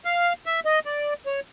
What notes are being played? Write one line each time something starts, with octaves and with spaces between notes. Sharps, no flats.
F5
E5
D#5
D5
C#5